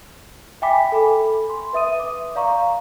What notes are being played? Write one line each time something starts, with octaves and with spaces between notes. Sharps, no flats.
E5 G5 G#5 B5 D6 B6
A4 G#5 B5
C6
B4 E5 D#6 D#7
D6
D5 F5 A#5 C#6